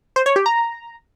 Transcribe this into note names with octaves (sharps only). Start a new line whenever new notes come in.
C5
C#5
G4
A#5